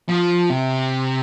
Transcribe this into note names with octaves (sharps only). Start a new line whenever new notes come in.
F3
C3